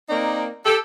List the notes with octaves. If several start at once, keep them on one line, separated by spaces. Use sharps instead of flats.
A#3 C4 D#4 A#4 D5
G4 A4